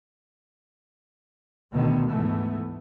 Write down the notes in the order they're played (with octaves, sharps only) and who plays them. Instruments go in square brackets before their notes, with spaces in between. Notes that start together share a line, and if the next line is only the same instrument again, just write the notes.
[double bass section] D2 B2 D3 D#3 B3
G#2 E3 A3 B3